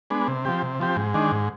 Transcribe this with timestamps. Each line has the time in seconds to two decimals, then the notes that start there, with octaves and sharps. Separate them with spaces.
0.10 G#3 B3 D4
0.28 C3
0.45 F3 C4 G4
0.62 C3
0.80 F3 C4 G4
0.96 G#2
1.14 D#3 G#3 D4
1.32 G#2